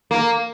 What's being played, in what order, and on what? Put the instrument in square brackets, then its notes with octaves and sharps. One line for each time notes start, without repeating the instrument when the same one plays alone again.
[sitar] A#3